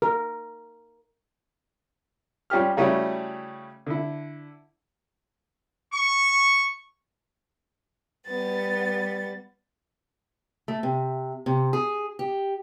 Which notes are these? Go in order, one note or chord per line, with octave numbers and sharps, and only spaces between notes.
A#4
G3 C#4 F4 G4 F6
C#3 G3 A3 C#4 E4 F#4
D3 E4
C#6
G3 B3 A6
A3
C3
C3
G#4
G4